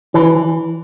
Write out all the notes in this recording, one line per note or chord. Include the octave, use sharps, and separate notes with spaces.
E3